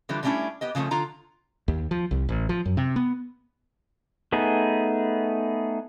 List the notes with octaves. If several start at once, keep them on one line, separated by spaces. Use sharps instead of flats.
D3 E3 F3 G3 D4
D3 G3 A3 C#4 D4 E4
B3 G4 D#5
C#3 F3 G3 A3 C#4
D3 F4 A#5
D#2
F3
C2
A1
F3
F#2
C3
B3
A3 B3 D#4 G#4